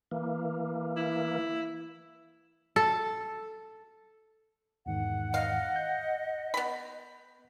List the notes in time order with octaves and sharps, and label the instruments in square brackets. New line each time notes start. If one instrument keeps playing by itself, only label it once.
[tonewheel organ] E3 A#3
[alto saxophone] E4
[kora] A4
[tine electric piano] E2 G#2 D#3 [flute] F#5
[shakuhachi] D#5 [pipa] F5
[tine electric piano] G6
[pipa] B3 B5